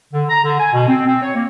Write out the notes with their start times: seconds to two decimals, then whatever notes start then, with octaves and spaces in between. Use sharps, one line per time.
0.13 D3
0.30 A#5
0.44 D3
0.60 G#5
0.73 B2
0.89 C4
1.07 C4
1.22 C#5
1.35 A#3